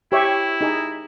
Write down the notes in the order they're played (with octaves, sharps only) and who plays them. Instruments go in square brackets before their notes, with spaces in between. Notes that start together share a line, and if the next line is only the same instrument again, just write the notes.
[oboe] E4 [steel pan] G4 C#5 E5
[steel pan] D#4 G#4